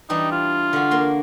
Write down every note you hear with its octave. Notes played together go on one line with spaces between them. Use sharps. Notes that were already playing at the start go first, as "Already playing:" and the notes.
E3 G3 D4 D#4
F4
D3 F#4
A#3 C6